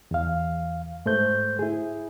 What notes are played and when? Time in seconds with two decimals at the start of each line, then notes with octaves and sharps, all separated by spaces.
0.11 E2 F5
1.06 G#2 A3 C5 G6
1.59 E4 G#4